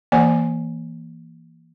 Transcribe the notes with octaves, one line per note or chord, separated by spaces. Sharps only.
E3 A#3 D5 G#5